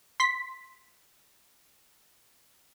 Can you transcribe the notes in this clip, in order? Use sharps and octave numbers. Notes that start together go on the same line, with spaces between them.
C6 B6